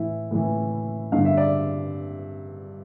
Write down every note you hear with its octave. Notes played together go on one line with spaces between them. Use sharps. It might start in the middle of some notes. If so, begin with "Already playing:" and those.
Already playing: A2 E3 E4
A2 E3
G2 D3 F5
E5
D5